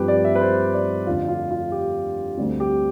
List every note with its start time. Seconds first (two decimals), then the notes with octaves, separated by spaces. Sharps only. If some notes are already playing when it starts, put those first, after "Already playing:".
Already playing: G2 F3 A3 C4 G4 B4
0.08 D5
0.24 E5
0.35 B4
0.41 C5
0.74 D5
1.06 F2 D3 A3 F4
1.28 F4
1.51 F4
1.72 G4
2.37 D2 D3 G3 C4
2.60 G4